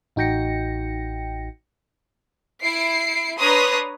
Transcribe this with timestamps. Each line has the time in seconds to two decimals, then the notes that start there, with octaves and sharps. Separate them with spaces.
0.16 A1 D#4 F#4 G5 A#6 C#7
2.63 E4 C7 D7
3.38 D4 B4 C#5 A#5 C6 D#6